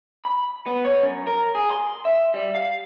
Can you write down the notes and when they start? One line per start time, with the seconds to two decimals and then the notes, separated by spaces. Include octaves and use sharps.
0.25 B5
0.66 B3
0.85 C#5
1.02 F#2
1.27 A#4
1.55 G#4
1.70 C6
2.05 E5
2.34 G3
2.55 F5